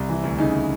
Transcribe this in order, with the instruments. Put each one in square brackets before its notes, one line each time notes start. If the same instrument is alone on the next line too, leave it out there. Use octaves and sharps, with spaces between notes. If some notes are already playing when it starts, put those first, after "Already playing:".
Already playing: [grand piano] C2
E3
D2
C#3 D#4